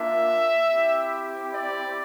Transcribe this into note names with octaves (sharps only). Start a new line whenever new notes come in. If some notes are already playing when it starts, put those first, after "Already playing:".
Already playing: A#3 D4 F4 E5
C4 E4 G4
D5